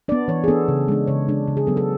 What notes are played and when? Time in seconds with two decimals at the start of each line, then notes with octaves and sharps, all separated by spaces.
0.08 D4 D5
0.12 B3
0.28 E3 C#5
0.44 G#4
0.48 B3 D4 A4
0.68 C#3
0.88 G#3 D4
1.07 C#3 C#5
1.28 G#3 D4
1.48 C#3
1.57 G#4
1.67 F#3 B3 A4
1.77 A4